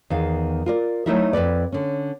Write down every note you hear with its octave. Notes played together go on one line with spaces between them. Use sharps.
E2 D#3 F5
F4 A#4 D5
F#3 A3 D#4 E4 A#4 E5
F2 A#2 B4 D5
D3 C#4